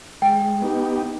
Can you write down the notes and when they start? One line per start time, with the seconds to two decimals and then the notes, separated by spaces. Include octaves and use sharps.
0.22 G#3 G5
0.62 B3 D#4 G4